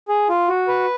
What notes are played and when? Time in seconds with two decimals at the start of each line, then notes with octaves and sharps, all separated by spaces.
0.08 G#4
0.29 F4
0.49 F#4
0.68 B4